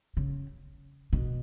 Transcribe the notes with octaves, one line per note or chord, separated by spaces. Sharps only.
C#3
B2